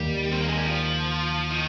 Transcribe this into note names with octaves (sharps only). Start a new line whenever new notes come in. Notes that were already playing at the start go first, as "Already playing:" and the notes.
Already playing: D#2 D#3 G3 A#3
C4
A#3
G#3
G3
F3
D#3